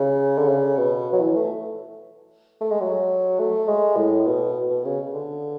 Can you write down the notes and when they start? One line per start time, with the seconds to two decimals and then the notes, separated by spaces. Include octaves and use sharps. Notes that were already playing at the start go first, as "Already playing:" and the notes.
Already playing: C#3
0.38 D3
0.48 C#3
0.77 B2
1.13 F#3
1.21 E3
1.36 A3
2.61 A3
2.71 G#3
2.81 F#3
3.39 A3
3.68 G#3
3.97 A2
4.27 B2
4.70 B2
4.85 C#3
5.14 D3